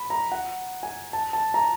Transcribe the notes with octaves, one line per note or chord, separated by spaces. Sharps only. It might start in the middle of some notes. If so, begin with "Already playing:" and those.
Already playing: B5
A#5
F#5
G#5
A5
A5
A#5